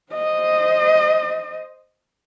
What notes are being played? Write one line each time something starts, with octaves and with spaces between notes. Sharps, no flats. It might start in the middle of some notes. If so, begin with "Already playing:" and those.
C5 D#5